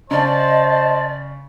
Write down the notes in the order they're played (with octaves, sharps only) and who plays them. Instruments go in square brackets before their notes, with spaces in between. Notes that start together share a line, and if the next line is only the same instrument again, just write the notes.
[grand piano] C#3 [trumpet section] C5 A5 [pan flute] D5 [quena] D#5